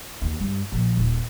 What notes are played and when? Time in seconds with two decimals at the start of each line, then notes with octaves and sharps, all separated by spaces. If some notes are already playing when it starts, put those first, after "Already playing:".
0.22 D#2
0.39 G2
0.72 A#1
0.97 D#1